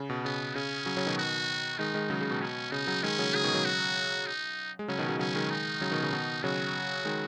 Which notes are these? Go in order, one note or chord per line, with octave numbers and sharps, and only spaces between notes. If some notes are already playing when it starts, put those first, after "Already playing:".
Already playing: C#3
B2
C#3 B3
C#3 C#4
C#3 F#3
C#3 F#3
B2 D#3
F#4
D#3 G#3 D#4
D#3 G#3
C#3 F#3
C#3
B2
B2 C#4
C#3 D#4
C#3 F#3
D#3 G#3 C#4
C#3 F#3
C#3 F#3 G#4
B2 D#3
C#3 F#3
F#4
D#4
G#3
C#3 F#3 C#4
B2 D#3
C#3 F#3
C#3 F#3 C#4
D#3 G#3
D#4
C#3 F#3
B2 D#3
C#3
B2 D#3
C#3 F#3 F#4
D#3 G#3